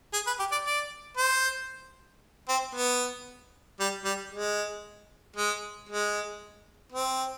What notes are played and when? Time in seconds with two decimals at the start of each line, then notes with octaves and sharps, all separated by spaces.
0.13 G#4
0.27 B4
0.39 G4
0.52 D5
0.65 D5
1.17 C5
2.49 C4
2.75 B3
3.80 G3
4.05 G3
4.32 G#3
5.36 G#3
5.89 G#3
6.92 C4